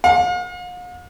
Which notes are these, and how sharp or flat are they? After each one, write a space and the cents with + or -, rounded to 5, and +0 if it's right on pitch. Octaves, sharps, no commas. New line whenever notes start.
F5 +45